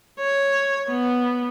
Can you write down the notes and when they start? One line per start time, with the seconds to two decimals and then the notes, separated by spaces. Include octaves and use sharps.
0.20 C#5
0.89 B3